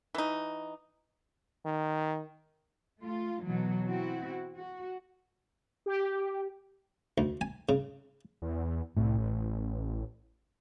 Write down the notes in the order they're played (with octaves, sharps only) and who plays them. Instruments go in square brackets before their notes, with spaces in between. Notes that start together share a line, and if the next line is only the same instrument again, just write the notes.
[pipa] E3 D#4
[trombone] D#3
[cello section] A3 F4
B2 E3 F#3
C4 E4 F#4
F#4
[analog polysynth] G4
[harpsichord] D2
G#5
C#3
[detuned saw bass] E2
[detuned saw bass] C2 [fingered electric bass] A2
[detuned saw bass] A1